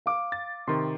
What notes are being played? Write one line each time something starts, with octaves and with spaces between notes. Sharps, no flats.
F5 D6
A6
C3 D#3 C6